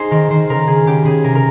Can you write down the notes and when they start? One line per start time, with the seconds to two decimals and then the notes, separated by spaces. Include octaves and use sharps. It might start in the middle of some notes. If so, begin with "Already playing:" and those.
Already playing: D#4 G#4 C5
0.11 D#3 A#4
0.30 D#3 C5
0.49 C#3 A#4
0.67 C#3 G#4
0.87 C#3 G4
1.05 C#3 G#4
1.24 C3 A#4
1.35 A#4